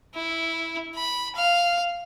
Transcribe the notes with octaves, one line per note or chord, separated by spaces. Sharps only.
E4
B5
F5